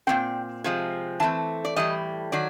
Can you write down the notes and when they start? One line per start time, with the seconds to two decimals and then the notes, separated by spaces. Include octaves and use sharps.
0.07 A#2 G3 C4 G5
0.64 C3 F3 G#3
1.20 E3 A3 C4 A5
1.65 D5
1.76 A2 E3 G3 D#5
2.32 D#3 F#3 D5